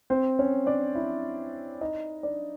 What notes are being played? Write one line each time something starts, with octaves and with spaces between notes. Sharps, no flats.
C4 C5
C#4 C#5
D4 D5
E4 E5
D#4 D#5
D4 D5